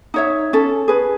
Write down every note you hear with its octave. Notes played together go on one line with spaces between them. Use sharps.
D#4 C#5 E5
C#4 A4
G#4 B4